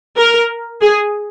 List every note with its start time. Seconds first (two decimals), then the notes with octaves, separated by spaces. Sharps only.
0.17 A#4
0.82 G#4